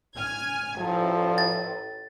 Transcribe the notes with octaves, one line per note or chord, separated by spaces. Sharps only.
G#5 F6 G#6
A1 F3 A4
A6